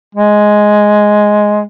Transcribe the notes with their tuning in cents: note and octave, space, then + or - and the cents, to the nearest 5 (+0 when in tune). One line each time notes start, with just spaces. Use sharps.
G#3 +5